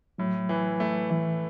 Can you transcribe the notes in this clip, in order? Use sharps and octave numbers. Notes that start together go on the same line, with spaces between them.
A2 F#3
E3
A3
E3 A3